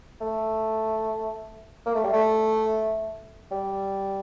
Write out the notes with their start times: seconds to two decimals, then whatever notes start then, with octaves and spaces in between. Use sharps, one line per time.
0.21 A3
1.86 A#3
1.95 A3
2.04 G3
2.13 A3
3.51 G3